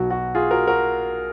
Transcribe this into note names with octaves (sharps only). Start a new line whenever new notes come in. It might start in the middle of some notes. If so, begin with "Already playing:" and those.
Already playing: B1 B2 F#3 F#4
F#4
F4 G#4
F#4 A#4
F#4 A#4